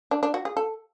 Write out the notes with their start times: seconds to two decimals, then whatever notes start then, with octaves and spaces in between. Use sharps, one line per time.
0.11 D4
0.23 D4
0.34 F#4
0.45 G#4
0.57 A4